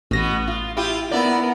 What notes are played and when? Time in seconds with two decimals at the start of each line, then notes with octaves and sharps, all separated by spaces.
0.11 A1 B2 B3 A#6
0.48 F4
0.77 E4 F4 G4
1.11 B3 E4 A#4 D5